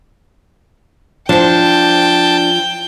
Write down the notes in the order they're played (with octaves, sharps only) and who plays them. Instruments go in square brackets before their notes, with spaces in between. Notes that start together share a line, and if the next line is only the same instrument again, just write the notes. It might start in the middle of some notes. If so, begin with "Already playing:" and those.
[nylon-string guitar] F3 [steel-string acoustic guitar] D4 C5 [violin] G5 [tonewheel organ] A5